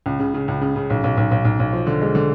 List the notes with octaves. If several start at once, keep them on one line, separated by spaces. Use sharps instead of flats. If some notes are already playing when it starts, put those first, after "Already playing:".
C#2
C#3
C#3
C#2
C#3
C#3
B1
B1
B1
B1
B1
B1
F3
D3
G#3
D3